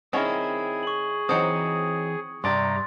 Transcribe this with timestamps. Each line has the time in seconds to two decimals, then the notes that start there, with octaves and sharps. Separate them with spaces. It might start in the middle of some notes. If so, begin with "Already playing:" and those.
0.13 D#3 C4 C#4 E4 G#4 A#4
0.83 C#6 F#7
1.29 E3 F#3 C4 D#4 C5 D#6 C#7
2.44 G2 C3 D4 G4 D5 A#5 C6 A6